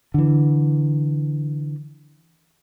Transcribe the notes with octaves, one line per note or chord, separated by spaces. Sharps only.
D3 E3